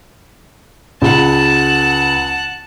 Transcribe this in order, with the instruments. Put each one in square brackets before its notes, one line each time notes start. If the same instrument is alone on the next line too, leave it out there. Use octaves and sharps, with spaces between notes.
[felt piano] C#2 [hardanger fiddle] F#5 A5